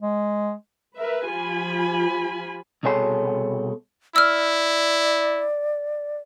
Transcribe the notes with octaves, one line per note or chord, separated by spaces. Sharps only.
G#3
A#4 B4 E5
F3 F4 G4 G#5 B5
C2 B2 G#4 A4 C#5 C6
E4 D5 E6 F6